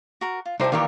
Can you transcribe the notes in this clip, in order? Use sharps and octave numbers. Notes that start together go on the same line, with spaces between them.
F#4 A#4
F4
C2 D#4 E4 G4 A4 C5 D5
D#3 E3 A#3 F4 G4 C#5 D5 A#5